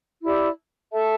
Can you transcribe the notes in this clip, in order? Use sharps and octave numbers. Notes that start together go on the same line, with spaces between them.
E4 G4 D5
A4 E5 A5